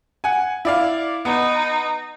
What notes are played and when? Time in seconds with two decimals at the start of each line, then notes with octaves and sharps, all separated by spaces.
0.24 F#5 G#5
0.65 E4 D5 F5
1.25 B3 D#4